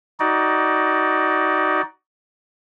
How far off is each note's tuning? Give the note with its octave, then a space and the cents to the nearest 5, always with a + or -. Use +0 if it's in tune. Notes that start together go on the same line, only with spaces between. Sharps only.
D#4 +15 F#4 +20 D5 +5